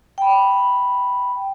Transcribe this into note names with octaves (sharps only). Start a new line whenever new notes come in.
G5 B5